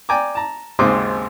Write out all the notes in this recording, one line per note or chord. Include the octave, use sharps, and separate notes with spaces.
D5 G5 G#5 A#5 D6
A5 A#5
G#1 D#2 G#2 C#3 C4 D6